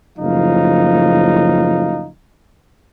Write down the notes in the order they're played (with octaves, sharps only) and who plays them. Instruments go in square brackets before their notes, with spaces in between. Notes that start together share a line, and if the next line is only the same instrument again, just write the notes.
[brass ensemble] F#1 A2 F3 D#4 F5